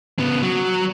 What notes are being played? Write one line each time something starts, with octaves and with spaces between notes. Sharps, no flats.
C#3 B3
F#3